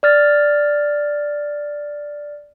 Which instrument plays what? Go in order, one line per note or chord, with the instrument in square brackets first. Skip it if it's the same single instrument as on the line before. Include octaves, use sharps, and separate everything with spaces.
[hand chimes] D5 F6 A6